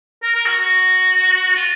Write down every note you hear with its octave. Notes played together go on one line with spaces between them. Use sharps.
A#4
A#4
F#4
F#4
F4